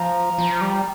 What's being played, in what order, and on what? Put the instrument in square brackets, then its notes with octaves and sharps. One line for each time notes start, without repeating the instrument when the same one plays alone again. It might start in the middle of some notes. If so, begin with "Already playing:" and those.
Already playing: [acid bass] F3 [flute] A#5
[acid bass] F3
G3